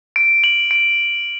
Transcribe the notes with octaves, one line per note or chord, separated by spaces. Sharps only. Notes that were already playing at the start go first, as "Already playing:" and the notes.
D7
F#7
D7